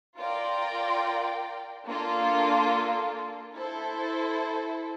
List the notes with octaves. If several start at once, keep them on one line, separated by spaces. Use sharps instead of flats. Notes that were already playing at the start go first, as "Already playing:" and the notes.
F4 A#4 D5 G5
A#3 D4 F4 A4
E4 A4 C5